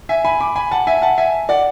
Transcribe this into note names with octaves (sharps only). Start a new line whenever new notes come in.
E5 G#5
G#5 B5
B5 D6
G#5 B5
F#5 A5
E5 G#5
F#5 A5
E5 G#5
D5 F#5